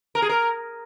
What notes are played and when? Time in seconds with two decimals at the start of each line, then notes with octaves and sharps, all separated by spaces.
0.15 A#4
0.22 G#4
0.29 A#4